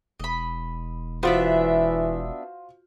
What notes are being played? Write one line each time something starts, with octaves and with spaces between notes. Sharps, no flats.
E1 D#5 B5
E3 B3 D4 F4 F#4 C5 E5